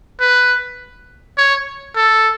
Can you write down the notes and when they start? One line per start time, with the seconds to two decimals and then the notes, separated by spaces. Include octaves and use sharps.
0.20 B4
1.37 C#5
1.96 A4